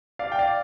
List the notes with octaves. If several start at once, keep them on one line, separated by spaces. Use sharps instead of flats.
D5 F5
G5
D5 F5